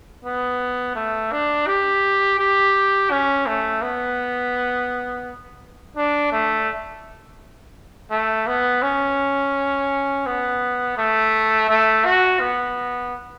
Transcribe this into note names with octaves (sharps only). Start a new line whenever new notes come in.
B3
A3
D4
G4
G4
C#4
A3
B3
D4
A3
A3
B3
C#4
B3
A3
A3
F#4
B3